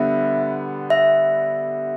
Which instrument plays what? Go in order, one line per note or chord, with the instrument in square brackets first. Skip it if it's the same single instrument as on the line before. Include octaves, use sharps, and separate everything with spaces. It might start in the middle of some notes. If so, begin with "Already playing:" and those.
Already playing: [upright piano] D3 G3 B3 [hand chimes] E5
[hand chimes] E5